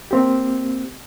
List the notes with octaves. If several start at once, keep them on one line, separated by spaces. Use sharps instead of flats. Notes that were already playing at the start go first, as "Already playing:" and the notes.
A#3 C4 G4